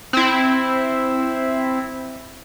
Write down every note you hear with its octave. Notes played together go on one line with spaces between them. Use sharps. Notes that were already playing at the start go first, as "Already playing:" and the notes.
C4 E4